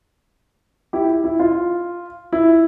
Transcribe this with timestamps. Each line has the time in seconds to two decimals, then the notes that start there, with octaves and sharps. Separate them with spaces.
0.93 E4 G4
1.24 E4
1.40 F4
2.33 E4